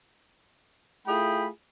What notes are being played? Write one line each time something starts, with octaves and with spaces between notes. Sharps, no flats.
A3 E4 F4 G#4 G5 B5